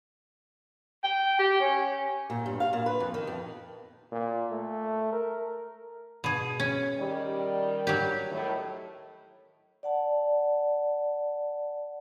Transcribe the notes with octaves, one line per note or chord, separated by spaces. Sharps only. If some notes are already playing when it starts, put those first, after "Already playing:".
G5
G4
C#4
A#2
G2
F5
A#2
B4
F2
D#3
F2
A#2
A3
A#4
B2 G#4
C#4
D#3 G3
F#3 G4
A2 D#3
D5 F#5 A5